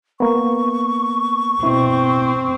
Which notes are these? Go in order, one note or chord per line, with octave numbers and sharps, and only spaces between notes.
A#3 B3 C#6
B2 C4 E4